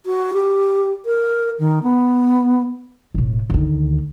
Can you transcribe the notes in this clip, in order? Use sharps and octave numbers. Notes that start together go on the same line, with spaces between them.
F#4
G4
A#4
D#3
B3
E1 A2
D2 D#3